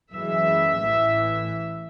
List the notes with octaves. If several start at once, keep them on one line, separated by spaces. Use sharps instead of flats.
F#2 E3 G#3 E5
A1 A2 E3